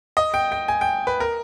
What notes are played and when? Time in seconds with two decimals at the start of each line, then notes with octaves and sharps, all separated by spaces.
0.17 D#5
0.34 G5
0.52 G5
0.68 G#5
0.81 G5
1.07 B4
1.20 A#4